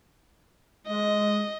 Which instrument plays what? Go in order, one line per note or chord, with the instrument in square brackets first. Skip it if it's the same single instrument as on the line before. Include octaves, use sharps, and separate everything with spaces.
[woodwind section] G#3 [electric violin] D#5